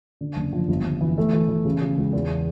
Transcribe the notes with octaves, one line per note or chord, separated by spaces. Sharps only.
D3
F#1
F3
G1
G1
E3
A3
E3
E3
C#3
C#3
C#2
E2